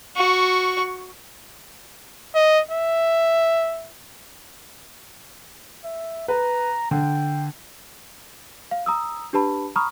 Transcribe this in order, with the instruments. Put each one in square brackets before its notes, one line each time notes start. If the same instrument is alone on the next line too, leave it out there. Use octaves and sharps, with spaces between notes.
[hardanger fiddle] F#4 C#6
[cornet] D#5
E5
[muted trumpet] E5
[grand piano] B4 [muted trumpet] A#5
[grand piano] D3 [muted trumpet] G5
[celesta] F5
A#5 D#6 E6
D4 G4 B4 A5 B5
A#5 B5 C#6 D#6 F6